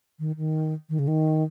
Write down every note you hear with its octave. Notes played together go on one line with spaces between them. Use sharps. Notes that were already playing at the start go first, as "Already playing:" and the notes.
D#3
D#3
D#3
C#3
D#3